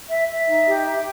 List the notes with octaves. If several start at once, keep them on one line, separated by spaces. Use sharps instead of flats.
E5
E5
D#4
G4
E5